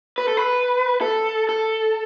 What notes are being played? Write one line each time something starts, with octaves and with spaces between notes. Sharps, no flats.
B4
A4
B4
A4
A4